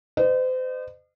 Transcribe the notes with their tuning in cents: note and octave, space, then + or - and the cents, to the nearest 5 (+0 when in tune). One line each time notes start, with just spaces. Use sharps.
C5 -35 D#5 -40